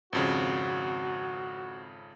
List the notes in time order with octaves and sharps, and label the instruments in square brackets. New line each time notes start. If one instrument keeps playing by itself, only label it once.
[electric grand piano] G#1 F2 C#3 [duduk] F#4